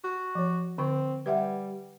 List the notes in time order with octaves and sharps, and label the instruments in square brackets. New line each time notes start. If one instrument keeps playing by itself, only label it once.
[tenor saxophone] F#4
[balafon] F3 C#5
[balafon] D3 C#6 [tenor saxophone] C4
[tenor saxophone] G3 [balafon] B4 E5 F#5